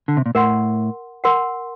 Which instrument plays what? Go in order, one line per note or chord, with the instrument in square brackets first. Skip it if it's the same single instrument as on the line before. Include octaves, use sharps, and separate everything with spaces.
[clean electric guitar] D3
C3
A#2
[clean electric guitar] A2 [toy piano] A#4 F#5 C6
[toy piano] A#4 F#5 C6